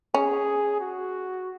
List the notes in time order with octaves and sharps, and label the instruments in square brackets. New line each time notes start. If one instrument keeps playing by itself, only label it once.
[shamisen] C#4 [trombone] G#4
[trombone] F#4